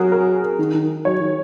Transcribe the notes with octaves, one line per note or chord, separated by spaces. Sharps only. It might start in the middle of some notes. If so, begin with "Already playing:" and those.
Already playing: F#3 F#4 G#4 A#4
A#4
D#3
D#3
F#3 C#5
D#3